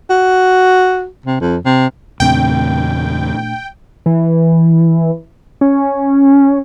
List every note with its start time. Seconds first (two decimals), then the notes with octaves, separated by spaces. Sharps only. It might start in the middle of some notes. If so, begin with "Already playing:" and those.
0.10 F#4
1.26 C3
1.41 F2
1.66 C3
2.20 E2 A#2 C#3 A3 C4 D4 G5
4.06 E3
5.61 C#4